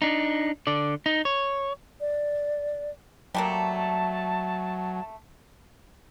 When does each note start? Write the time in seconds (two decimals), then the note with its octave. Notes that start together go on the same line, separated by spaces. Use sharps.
0.02 D4 D#4
0.67 D3 D5
1.06 D#4
1.25 C#5
2.01 D5
3.34 F#3 G3 A3 A#3 A5